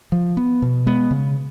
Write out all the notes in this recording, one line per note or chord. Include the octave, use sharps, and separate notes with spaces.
F3
B3
B2
G#3 B3
C#3